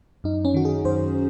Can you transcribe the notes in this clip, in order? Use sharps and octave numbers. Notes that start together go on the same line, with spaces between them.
F#2 D#4
C#4
D#3 F#4
G#4
F#2 C5